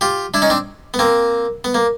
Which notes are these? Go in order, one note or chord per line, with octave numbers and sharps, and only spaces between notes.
F4 G4
D4 E4
C#4 D#4
C4 D4
B3
A#3 C4
B3
A#3